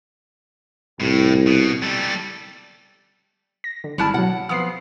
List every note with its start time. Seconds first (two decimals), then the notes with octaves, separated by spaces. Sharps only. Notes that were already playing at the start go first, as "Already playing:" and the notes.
1.00 C2 A2
1.47 B2
1.82 G3 A4
3.64 A#6
3.84 D3
3.98 G#1 G3 E4 A5 F6
4.14 B2 F#3 F#5
4.49 F2 B3 D#6 C7